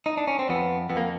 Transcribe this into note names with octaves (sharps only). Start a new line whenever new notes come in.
D#4
D4
C#4
C4
F2 B3
F2 B3
A#3